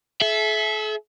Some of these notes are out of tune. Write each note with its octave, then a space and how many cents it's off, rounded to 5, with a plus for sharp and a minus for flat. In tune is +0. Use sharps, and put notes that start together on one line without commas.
A4 -45 E5 +0